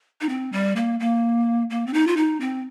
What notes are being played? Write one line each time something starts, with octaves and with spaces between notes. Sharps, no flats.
D#4
C4
G3
A#3
A#3
A#3
C4
D#4
F4
D#4
C4